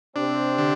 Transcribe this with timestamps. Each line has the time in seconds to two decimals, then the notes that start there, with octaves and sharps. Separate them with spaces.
0.16 C3 C4 D4
0.59 D3